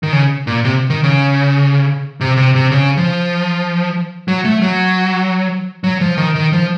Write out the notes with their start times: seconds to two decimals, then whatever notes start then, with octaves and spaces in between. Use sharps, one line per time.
0.03 D#3
0.13 C#3
0.47 A#2
0.64 C3
0.90 D#3
1.04 C#3
2.21 C3
2.37 C3
2.55 C3
2.72 C#3
2.97 F3
4.28 F#3
4.45 A3
4.62 F#3
5.84 F#3
6.01 F3
6.18 D#3
6.35 D#3
6.53 F3